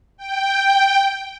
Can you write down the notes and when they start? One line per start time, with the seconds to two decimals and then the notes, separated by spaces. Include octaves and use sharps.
0.17 G5